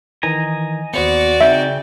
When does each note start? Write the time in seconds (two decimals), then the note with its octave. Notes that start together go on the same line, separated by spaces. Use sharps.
0.23 D#3 E3 D#5 G#5 A#5
0.94 D#2 B3 F#4 C5 D5 C#7
1.41 C#3 C4 D#4 E5 G5